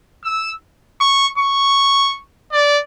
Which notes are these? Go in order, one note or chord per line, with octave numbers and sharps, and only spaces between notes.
E6
C#6
C#6
D5